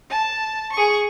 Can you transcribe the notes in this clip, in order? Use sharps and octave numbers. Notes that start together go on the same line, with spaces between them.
A5
G#4 C#6